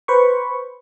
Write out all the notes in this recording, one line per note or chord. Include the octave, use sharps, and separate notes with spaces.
B4 C5 B5 C#6